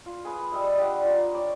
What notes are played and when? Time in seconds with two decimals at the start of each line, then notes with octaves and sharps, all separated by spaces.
0.06 F4
0.25 G#4 B4
0.52 G3 D#5 E5
0.78 G3 D4 F4 F#5
1.05 F4 A#5
1.34 C#5 D5